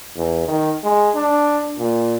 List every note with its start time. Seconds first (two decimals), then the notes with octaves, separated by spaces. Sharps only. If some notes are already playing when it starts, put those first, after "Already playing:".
0.16 E2
0.48 D#3
0.84 G#3
1.15 D4
1.79 A#2